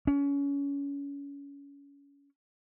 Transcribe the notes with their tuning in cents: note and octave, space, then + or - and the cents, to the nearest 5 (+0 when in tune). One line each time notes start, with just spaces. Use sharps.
C#4 +25